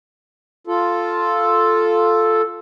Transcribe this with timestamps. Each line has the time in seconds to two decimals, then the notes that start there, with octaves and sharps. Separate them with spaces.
0.67 F4 A4